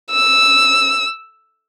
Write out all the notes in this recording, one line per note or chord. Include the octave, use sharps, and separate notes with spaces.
E6